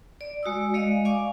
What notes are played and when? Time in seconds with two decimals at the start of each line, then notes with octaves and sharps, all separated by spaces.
0.21 D5
0.43 G#3 F#4 D5 D#6 E6
0.74 G#3 D5 D#5 F5
1.05 D5 F5 G#5 C#6 D6